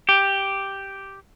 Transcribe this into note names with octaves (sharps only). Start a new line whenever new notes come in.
G4